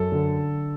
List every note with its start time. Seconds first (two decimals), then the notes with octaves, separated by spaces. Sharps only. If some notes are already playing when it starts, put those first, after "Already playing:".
Already playing: F#2 A4
0.12 D3